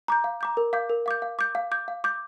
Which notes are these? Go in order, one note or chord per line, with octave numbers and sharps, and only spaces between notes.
A#5 D6 G6
F5
A#5 D6 G6
A#4
F5 D6 G6
A#4
F5 D6 G6
F5
D6 G6
F5
D6 G6
F5
D6 G6